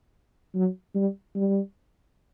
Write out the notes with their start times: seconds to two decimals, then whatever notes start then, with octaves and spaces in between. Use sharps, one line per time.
0.55 F#3
0.95 G3
1.35 G3